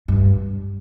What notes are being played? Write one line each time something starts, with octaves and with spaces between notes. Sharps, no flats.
G2